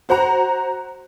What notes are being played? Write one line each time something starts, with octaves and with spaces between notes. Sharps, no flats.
F#4 C5 F#5 A#5